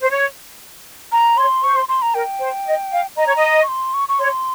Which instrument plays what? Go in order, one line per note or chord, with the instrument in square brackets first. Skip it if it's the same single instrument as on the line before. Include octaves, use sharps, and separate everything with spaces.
[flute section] C5
C#5
[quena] A#5
[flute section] C#5 [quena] C6
[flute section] C5 [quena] C#6
[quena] C6
C6
A#5
[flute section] A#4 [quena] G5
[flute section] C5
D#5
F5
[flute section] D#5 [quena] A#5
[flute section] C#5
D#5
[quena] C#6
C6
C#6
C#6
[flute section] C#5 [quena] C6